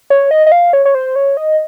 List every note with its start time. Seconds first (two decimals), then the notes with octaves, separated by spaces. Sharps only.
0.10 C#5
0.31 D#5
0.47 D#5
0.52 F5
0.73 C#5
0.85 C#5
0.95 C5
1.16 C#5
1.37 D#5